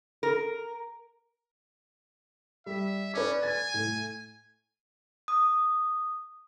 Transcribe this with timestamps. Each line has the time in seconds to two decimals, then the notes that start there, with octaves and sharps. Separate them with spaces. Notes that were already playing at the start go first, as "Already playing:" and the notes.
0.23 A#4
2.66 G3 E5
3.14 C#4 B4 D5 D6
3.43 G#5 A6
3.74 A2 A3
5.28 D#6